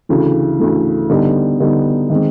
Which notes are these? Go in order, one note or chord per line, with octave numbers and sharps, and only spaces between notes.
D2 C#3 E3 A3
D2 C#3 E3 A3
D3 G3 B3 D#4
D3 G3 B3 D#4
D#3 G#3 C4